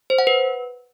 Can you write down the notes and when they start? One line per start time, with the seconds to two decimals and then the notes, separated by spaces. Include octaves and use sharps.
0.10 C5
0.18 F#5
0.27 B4